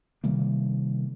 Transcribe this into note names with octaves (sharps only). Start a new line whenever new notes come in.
C3 D#3 G3 A#3